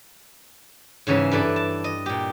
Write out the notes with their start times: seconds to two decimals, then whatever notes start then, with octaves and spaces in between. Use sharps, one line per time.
1.07 G#2 C#3 E3 C#4 E5
1.31 G2 E4 A4 B4 D5
1.56 A5
1.84 D#5
2.06 A#2 G4